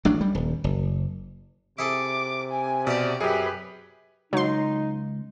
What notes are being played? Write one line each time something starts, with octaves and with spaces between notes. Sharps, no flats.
A1 F#3 D4
G3
D#1
F#1
C3 E4 G#4 A4 D6
G#5
B2 G4 D5 E5
F#2 G4 G#4 B4
C#2 F#3 D#4 C6